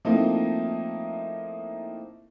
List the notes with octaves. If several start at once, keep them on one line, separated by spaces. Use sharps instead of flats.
F3 A3 A#3 C4 D#4 E4